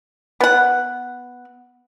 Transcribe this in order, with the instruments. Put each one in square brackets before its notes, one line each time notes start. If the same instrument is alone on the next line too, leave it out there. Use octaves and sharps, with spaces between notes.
[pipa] B3 F#5